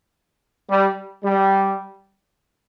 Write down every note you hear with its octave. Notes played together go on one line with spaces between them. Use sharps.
G3
G3